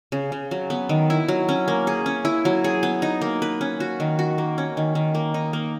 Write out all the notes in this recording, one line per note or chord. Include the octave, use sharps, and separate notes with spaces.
C#3
C#3
F#3
B3
D#3
E4
F#3
C#4
A#3
G#4
C#4
E4
F#3
G#4
B3
D#4
A#3
B4
C#4
F#4
D#3
F#4
A#3
C#4
D#3
D#3
A#3
D#4
A#3